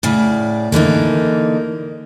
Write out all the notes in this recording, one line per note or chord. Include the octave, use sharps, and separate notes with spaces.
A2 C#3 D5
D3 E3 A#3 D#4